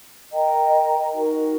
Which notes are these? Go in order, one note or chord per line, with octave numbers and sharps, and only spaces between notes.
A#4 D#5 G5 A#5
D#4 F#4 A#4